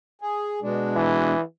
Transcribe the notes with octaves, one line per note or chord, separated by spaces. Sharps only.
G#4
B2 G#3 D4
E3